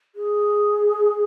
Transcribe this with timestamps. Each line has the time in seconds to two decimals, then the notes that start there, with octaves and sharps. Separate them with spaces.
0.15 G#4